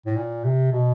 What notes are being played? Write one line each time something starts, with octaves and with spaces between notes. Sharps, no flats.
A2
A#2
C3
B2